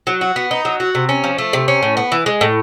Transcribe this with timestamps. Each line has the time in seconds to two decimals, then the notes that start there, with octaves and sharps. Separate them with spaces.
0.07 F#3
0.21 F#4
0.36 B3
0.51 D#4
0.65 F#3
0.80 F#4
0.95 C3
1.09 C#4
1.24 F3
1.38 A3
1.53 C3
1.68 C#4
1.83 A2
1.97 B3
2.12 E3
2.26 G#3
2.41 A2